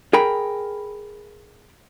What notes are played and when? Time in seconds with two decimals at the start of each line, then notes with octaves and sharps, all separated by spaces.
0.13 G#4 A#4 G5 B5